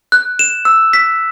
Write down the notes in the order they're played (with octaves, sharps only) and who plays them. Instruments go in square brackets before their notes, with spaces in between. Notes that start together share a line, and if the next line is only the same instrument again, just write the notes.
[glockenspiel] F#6
E7
E6
B6